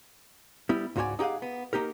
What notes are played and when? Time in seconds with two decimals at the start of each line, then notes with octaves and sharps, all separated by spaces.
0.69 G3 B3 E4
0.96 C#2 G#2 F#4 C#5 D5 G#5
1.19 D#4 G4 G#4 F5 F#5
1.42 B3
1.73 A#3 D#4 G4 A#4